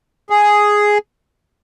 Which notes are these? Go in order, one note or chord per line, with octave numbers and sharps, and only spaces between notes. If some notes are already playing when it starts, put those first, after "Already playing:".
G#4